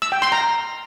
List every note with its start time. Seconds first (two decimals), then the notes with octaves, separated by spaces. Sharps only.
0.02 E6
0.12 G5
0.22 C6
0.32 A#5